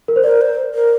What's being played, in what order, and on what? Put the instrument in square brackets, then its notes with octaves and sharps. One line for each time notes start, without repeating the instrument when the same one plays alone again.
[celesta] A#4
C5
[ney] A#4 [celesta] D5
[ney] C5
A#4